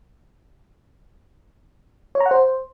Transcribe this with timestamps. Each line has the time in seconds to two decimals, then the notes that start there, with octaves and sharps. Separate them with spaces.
2.15 C#5
2.20 A#5
2.26 F#5
2.31 C5